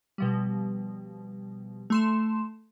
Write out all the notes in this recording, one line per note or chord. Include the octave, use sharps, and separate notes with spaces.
B2 F3 G3
A3 C6 E7